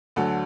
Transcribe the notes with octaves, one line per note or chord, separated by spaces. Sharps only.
D2 D3 F#3 A4